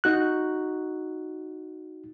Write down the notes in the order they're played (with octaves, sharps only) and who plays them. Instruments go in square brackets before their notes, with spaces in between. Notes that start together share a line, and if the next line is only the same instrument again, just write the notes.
[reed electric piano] D#4 F#4 F#6